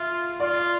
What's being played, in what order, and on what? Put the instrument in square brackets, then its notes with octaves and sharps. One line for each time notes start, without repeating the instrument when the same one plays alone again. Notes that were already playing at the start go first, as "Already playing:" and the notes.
Already playing: [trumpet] F4 [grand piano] E5
[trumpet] F4 [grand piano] D5